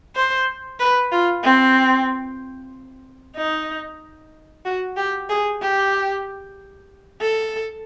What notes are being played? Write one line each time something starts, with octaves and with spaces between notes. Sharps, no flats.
C5
B4
F4
C4
D#4
F#4
G4
G#4
G4
A4